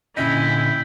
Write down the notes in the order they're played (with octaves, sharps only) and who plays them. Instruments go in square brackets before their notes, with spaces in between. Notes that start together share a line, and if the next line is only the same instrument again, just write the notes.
[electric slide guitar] A#2 D3 D#5 [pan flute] C#4 [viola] E4 [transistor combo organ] G5 B5